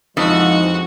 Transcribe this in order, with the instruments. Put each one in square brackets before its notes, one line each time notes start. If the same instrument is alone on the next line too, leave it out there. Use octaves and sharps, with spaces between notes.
[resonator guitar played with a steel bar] F2 [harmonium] E3 F3 G#3 [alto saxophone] D#4 [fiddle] F#4 F#5